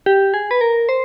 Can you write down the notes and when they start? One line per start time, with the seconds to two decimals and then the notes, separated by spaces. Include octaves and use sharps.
0.06 G4
0.34 G#4
0.51 B4
0.61 A#4
0.89 C5